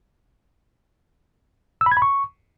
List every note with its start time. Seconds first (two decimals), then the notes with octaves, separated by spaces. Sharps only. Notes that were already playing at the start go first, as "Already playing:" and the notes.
1.81 E6
1.86 B5
1.92 G#6
1.97 B5
2.02 C#6